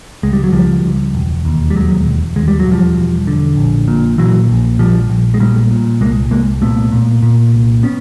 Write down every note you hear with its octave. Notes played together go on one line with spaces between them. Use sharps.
C#2 G#3
G3
F#3
C#2 F3 G3
C#2
E1
D#2
G3
E1 F#3 G#3
E1
D#2 G#3
G3
F#3
E1
F3 G3
E1
D3
A#1
A#2
A#2 E3 F#3
A#1
A#1 F3 G3
A#1
G#3
A#2 G3 A3
A#2
C2 G#3 A#3
C2 G#3 A#3
A#2 A3 B3
A#2
A#2
C2
B3 C#4